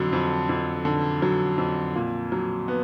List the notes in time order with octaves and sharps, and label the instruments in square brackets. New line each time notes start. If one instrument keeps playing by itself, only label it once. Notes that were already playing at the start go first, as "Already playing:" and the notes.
Already playing: [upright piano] F2 D3 F#3
F2
F2
D3
F#3
F2
A#2
F#3
B3